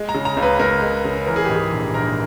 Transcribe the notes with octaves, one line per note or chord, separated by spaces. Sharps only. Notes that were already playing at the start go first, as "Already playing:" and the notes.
Already playing: G#3
A#5
C#3
A#5
C#2
B4
C#2 A#4
G#3
C#3
E3 A#4
G#4
G4
G#2 G#4
A#1
A#1 A#4